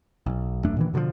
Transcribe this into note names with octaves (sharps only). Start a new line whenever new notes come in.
B1
E1 F#2 A3 D4
A#2 D#3 E3
B2 D3 E3 F3